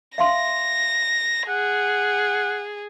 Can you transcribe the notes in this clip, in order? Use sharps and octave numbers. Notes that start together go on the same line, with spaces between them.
E5 F5 C6 A#6
G#4 F#5